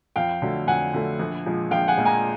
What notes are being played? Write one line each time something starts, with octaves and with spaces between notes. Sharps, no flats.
F2 F5 G5
D3 F#3 A3
F2 F#5 G#5
D3 F#3 A3
A#1
A#2 F3 G#3
A#1 F5 G5
F#5 G#5
A#2 F3 G#3
G#5 A#5